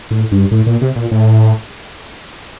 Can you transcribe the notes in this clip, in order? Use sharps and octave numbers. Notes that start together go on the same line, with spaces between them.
A2
G2
A2
A#2
C3
A#2
A2